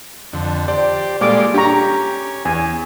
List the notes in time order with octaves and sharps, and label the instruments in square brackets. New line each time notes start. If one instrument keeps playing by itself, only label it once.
[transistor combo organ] F2 D3
[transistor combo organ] G4 C5 [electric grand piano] D5
[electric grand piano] A#2 A4 [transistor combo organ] G3 G#3 F4 [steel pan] D5 D6
[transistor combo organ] C#4 [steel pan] D4 A#5 [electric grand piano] G4 C#6
[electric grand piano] E2 [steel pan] G#5